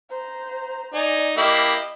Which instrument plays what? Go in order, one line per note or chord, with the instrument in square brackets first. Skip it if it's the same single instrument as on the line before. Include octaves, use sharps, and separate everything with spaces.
[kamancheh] C5 A#5
[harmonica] D#4 [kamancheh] D5 G#5
[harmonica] A#3 E4 G4 [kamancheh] D#5